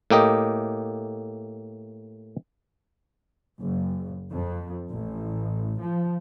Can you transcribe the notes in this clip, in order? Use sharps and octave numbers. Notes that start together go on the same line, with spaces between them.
A2 A#3 G4 D#5
F#1
F2
A1
F3